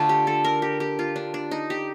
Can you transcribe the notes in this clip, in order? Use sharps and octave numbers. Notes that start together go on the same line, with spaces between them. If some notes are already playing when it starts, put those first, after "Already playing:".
Already playing: D3 A3 F4 A4
G4
A4
A#4
G4
G4
F4
D4
D4
D#4
G4